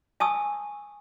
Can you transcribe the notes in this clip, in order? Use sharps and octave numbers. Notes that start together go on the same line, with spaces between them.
G#5 A5 C#6 D#6 E6